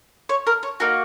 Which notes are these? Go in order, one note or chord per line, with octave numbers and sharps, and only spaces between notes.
C#5
A#4
C#5
A#3 D#4 F#4 A#4